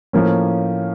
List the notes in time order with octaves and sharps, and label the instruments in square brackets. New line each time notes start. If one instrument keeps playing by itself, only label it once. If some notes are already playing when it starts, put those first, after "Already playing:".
[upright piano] A2 F3 A#3 C#4